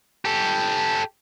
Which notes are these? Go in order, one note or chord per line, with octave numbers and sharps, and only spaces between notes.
G4 A4